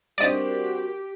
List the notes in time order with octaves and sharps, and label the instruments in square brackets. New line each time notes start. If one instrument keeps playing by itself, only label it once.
[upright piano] G3 C4 D4 [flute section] F#4 A#4 [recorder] G4 [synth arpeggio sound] D5 D#5